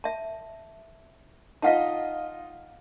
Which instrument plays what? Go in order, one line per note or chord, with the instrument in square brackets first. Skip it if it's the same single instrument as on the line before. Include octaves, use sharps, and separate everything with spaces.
[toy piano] E5 A5
[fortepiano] D#4 F4 D#5 [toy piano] F5 F#5 A5